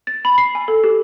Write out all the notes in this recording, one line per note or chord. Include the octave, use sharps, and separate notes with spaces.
A6
B5
C7
G#5
A4
G4